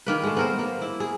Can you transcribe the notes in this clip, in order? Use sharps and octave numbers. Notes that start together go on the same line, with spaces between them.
D#3 A#3 B4
G#3 A3
B3 A#4 C5
A#3
E4
G#4